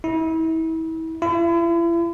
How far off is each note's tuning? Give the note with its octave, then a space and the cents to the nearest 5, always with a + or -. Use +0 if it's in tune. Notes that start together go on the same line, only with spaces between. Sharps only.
E4 -35
E4 +40